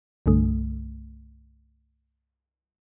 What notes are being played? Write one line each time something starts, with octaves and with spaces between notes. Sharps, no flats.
C2 G2 D3 A3